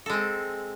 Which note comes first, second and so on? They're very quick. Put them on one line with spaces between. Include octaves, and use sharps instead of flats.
A4 G#3 C4